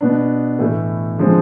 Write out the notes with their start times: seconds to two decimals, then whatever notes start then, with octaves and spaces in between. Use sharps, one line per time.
0.01 B2 B3 D4
0.59 A2 E3 A3
1.18 D3 F3 G#3 C4